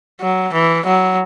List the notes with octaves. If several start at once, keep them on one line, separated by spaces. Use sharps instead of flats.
F#3
E3
F#3